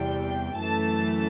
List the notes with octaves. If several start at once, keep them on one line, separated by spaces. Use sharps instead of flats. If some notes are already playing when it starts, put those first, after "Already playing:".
Already playing: E2 C3 G3 G5
F#2 E3 A3 A5